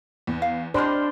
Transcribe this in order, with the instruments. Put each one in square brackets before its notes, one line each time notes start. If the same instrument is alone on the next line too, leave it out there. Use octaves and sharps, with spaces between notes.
[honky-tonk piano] E2
[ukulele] F5
[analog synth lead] D4 [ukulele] G4 D#5 [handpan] C5 [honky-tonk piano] B5 C6 F6